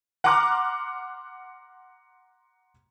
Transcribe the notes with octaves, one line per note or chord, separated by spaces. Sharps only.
F#5 A#5 C6 D6 F6 F#6